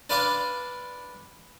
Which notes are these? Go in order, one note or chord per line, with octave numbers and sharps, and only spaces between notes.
D4 B4 F5 C6 D6